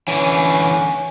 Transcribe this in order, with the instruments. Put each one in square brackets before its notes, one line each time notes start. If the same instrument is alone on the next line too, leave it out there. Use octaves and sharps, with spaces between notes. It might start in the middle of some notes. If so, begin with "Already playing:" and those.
[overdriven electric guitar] D3 E3 [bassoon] C#4